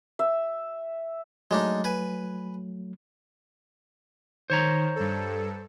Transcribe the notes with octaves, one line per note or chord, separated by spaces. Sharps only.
E5
F#3 G#3 A3 D4 D#4
B4 G#5
D#3 C5 C#5 A#5
G2 A4